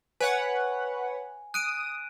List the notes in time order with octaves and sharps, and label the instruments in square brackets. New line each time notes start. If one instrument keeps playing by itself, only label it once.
[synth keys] B4 C#5 F#5 [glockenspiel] G#5
[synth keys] D#6 [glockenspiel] F#6 D7 D#7